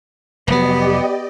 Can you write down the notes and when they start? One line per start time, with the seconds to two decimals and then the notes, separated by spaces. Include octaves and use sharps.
0.48 F1 F#3 B3 G4 D5 D#5